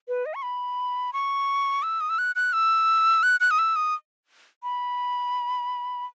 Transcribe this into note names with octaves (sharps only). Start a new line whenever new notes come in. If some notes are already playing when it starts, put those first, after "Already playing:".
B4
D#5
C#6
B5
C#6
E6
D#6
E6
F#6
F#6
E6
F#6
F#6
D#6
E6
D#6
B5